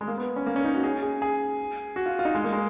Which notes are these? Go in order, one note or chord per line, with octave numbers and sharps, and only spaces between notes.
G#3
A#3
B3
C#4
A#3
C#4
D#4
F#4
G#4
G#4
G#4
F#4
F4
F4
D#4
G#3
A#3
G#3